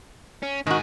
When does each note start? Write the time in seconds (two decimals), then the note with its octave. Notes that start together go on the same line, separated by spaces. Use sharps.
0.43 C#4
0.67 G#2 D#3 F#4 G#4